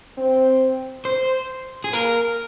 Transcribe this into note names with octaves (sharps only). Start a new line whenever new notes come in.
C4
C5
G#4
A#3 A#4